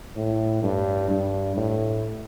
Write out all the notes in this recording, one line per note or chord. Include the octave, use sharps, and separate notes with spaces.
A2
G2
G2
A2